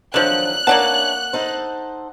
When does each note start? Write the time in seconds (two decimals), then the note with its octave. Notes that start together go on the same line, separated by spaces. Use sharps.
0.14 D3 D#3 F3 F#3 F#6
0.67 A#3 C#4 D4 E4 D5 F#5 A5
1.33 D#4 A4 C5